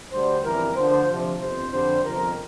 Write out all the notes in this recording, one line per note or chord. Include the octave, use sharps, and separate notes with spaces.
D2 D3 G3 C5
G1 F2 E3 G3 A#4
D2 D3 F3 C5
D2 C3 F3
G1 F2 C3 C5
F2 D3 G3 C5
G1 F2 C3 A#4